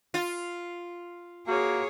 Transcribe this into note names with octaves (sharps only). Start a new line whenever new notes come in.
F4
A#3 F#4 G#4 C#5